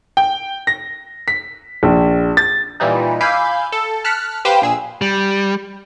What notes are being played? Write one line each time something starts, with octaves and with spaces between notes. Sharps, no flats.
G5
A#6
B6
A#1
A6
A#2 E3 G3 D#4
F5 G#5 B5 D6 E6 G6
A4
A5 F6 F#6 B6 C#7
G4 B4 C5 F5 G5 G6
A#1 G#4 E6
G3